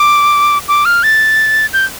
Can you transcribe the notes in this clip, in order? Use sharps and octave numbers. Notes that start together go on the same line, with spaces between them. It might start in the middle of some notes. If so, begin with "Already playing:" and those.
Already playing: D6
D6
F6
A6
G6